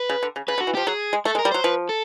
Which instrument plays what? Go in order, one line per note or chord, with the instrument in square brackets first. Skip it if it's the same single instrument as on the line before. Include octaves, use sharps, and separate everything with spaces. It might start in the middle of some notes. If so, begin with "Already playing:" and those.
Already playing: [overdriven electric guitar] B4
[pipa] C#3
D3
C#3
[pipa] C#3 [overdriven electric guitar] B4
[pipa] D3
[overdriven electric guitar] F#4
[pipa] E3
[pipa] F3 [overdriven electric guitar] G4
[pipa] F#3 [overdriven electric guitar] G#4
[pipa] G#3
[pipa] A3 [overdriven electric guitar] A4
[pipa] G#3
[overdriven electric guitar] A#4
[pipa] G3
[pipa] F#3 [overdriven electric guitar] C5
[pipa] F3 [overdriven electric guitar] B4
[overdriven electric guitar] A4